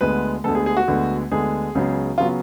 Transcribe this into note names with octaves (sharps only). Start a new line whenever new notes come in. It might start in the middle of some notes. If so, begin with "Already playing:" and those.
D2 D3 G#3 B3 B4
D2 D3 G#3 B3 A4
G#4
G#4
F#4
D2 D3 G#3 B3
D2 D3 G#3 B3 G#4
C#2 C#3 F#3 B3
C#3 F#3 B3 F4